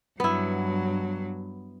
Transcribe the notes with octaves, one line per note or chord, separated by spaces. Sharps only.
G2 F#3 B3 E4